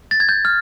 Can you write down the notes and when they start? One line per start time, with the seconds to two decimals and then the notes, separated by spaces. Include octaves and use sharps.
0.11 A6
0.20 G#6
0.29 G6
0.45 F6